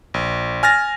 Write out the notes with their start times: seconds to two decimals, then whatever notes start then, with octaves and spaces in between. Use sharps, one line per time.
0.14 A#1
0.63 G#5 F6 A6 A#6